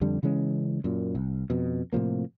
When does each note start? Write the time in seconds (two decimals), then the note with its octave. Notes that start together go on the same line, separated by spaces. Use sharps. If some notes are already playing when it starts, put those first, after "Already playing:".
0.01 F2 D3 G3
0.23 C#3 E3 G#3 C#4
0.84 F#2 A#2
1.15 C2
1.50 F2 B2
1.93 A2 C3 F3 A#3